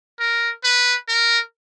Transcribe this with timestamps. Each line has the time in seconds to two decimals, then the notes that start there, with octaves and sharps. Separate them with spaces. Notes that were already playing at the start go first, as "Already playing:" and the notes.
0.20 A#4
0.64 B4
1.08 A#4